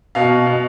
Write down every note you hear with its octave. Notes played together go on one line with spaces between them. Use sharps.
B2 F5
B2